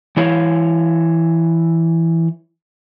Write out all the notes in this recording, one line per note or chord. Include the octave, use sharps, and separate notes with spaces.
E3 E4 C#5 F5